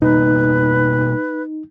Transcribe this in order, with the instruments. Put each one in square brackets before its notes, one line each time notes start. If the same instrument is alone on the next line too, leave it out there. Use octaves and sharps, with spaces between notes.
[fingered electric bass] B2 G3 A#3 [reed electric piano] D#4 [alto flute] B4